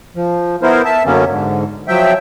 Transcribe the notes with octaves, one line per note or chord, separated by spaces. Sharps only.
F3
B3 E4 A#4 C5
E5 A5
F#2 D3 F#3 A#3 B3 C#4
G#2 D3
F3 F#3 E5 G5